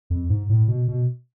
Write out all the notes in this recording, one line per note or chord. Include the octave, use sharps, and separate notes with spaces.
F2
G#2
A2
B2
B2